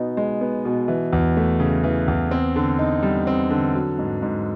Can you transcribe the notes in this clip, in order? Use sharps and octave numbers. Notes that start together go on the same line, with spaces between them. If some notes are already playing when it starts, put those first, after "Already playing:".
Already playing: B2 B3 D#4
G#3
B3
B2
E3
E2
A3
C#3
E3
E2
C4
D3
D#4
G3
C4
D3
F#3
G#2
G#2